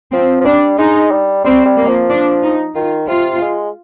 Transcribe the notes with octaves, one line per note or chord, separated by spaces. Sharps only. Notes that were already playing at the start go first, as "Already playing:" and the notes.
F3 C4
F3
G3 D4
G#3 D#4
G3
G3 C4
G3
A#3
F3
D4
D#4
D#3 F4
C3 F4
G#3